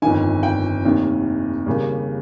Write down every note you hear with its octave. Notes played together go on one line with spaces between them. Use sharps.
G1 F2 D#3 G#5
G5
F1 D#2 D#3
D#2 C#3 G3 A#3